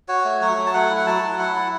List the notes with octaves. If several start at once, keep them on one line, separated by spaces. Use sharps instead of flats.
F#4 C#5
A3
F#3 C#5
F#3
A5
A3 F#5
E4
F#5
F#3 A5
F#3
E4 F#5
E4